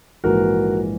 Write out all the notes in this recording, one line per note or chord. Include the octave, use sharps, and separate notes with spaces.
A#1 G#2 E3 F#4 A#4